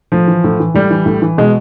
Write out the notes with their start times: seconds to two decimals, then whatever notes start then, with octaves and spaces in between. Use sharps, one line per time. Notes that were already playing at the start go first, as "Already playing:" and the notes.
0.12 A2 F3
0.28 E3
0.44 A2
0.60 E3
0.74 A2 G3
0.91 E3
1.06 A2
1.22 E3
1.38 B2 G#3